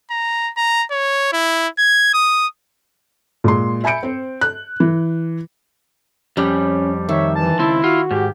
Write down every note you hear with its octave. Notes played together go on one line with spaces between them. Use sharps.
A#5
A#5
C#5
E4
G#6
D#6
A#2 G#3 C6
E5 G#5 B5 G6 C#7 D7
C4 C5
F#6
E3
F2 G3 C#4 G4
D#3 C#5 E5
E3 A5
C#2 C4 E4
F4 F#4
G#2 G4